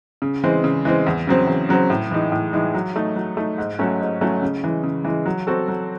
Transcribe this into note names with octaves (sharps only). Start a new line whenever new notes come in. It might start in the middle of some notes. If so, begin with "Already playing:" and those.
C#3
E3 G#3 C4
C#3
E3 G#3 C4
E2
C#3 F#3 C4
E2
C#3 F#3 C4
A2
E3 G#3 D#4
A2
E3 G#3 D#4
F#3
A3 D#4
F#3
A3 D#4
G#2
F#3 A3 C#4
G#2
F#3 A3 C#4
C#3
E3 G#3
C#3
E3 G#3
F#3
C4 F#4 A4
F#3